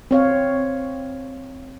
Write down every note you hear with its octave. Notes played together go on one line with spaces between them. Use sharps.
C4 C#5 F5